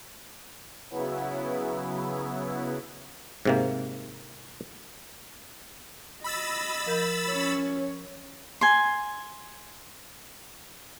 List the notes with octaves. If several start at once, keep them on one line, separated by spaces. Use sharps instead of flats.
C#3 F#3 B3 E4
G#2 C3 A#3
D#5 B5 E6 A6
F3 A#4 G6
C#4 C#5
G#5 C6